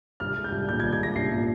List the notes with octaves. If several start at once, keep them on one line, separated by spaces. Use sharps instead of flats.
C2 F6
G#3
G6
C2
A#2 G6
G#6
C2
G#6
G#3 A#6
C2 C7
A#2